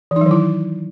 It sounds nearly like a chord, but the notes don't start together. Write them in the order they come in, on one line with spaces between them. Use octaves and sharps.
E3 D#4 F#3 D#3 E4